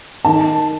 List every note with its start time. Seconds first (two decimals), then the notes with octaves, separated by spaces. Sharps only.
0.25 D#3 A5